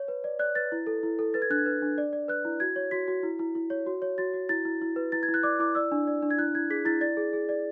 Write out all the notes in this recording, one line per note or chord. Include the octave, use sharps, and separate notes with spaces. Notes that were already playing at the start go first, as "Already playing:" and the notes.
Already playing: C#5
B4
D5
D5 F#6
B4 A6
E4
A4
E4
A4
B4 A6
G#6
D4 F#6
G#6
B4
D4
D5
D5
B4 F#6
E4
F#4 G#6
C#5
F#4 B6
F#4
E4
E4
E4
C#5
F#4
C#5
F#4 A6
F#4
E4 A6
E4
E4
B4
E4 A6
G#6
E4
F#6
D5 D6
E4 D6
D5 E6
D4
D5
D4
G#6
E4 F#6
E4 G#6
G#4 B6
E4 A6
D5 A6
G#4
G#4
D5